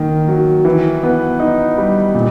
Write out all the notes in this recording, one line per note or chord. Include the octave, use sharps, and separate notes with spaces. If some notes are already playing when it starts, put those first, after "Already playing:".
Already playing: D#3 A#3
F#3
E3
B3
D#4
G3
A#2